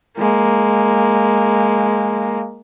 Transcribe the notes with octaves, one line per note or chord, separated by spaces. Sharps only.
G#3 A#3